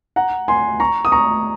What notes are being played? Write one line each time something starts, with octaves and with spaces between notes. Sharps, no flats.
F#5 A#5
G#5 C6
A#5 C#6
D#6
A#5 C#6